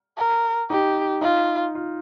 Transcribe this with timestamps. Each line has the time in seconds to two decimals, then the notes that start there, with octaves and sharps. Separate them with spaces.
0.17 A#4
0.70 D#4 G4
1.21 D#4 F4
1.75 F4